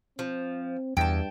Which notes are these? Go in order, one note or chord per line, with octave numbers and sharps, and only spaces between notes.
F3 C4
E2 G2 G5 A5